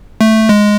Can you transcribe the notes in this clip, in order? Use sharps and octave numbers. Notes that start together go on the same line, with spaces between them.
A3
G#3